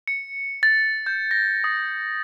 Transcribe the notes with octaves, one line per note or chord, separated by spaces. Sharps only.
C#7
A6
G6
A#6
D#6